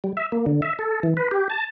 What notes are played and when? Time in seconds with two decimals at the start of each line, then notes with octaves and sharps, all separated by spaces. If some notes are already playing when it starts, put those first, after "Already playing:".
0.04 G3
0.17 E5
0.32 A#3
0.46 D3
0.62 E5
0.79 A4
1.03 E3
1.17 B4
1.31 G4
1.50 A5